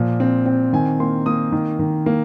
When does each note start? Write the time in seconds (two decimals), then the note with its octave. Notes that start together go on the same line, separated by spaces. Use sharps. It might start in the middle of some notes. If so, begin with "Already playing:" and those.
Already playing: A#2 F3
0.20 C4
0.46 C4
0.73 D#3 G#5
1.00 A#3 C6
1.26 A#3 D#6
1.52 D#3
1.79 D#3
2.06 A#3